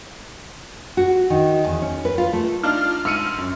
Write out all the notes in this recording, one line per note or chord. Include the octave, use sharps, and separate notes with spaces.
F#4
D#3
E2
C#4
B4
F4
A3
D4 D#4 F4 F6
G#2 E6 C#7 D#7
F#2